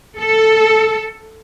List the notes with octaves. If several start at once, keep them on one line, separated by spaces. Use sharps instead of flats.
A4